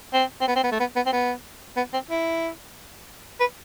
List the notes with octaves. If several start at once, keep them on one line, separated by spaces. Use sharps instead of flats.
C4
C4
B3
C4
B3
A3
B3
B3
C4
B3
B3
C4
E4
B4